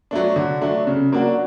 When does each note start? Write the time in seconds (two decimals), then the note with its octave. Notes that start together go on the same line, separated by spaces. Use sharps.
0.11 F#3 A3 D4
0.36 D3
0.61 F#3 A3 D4
0.87 C#3
1.12 F#3 A#3 D4 F#4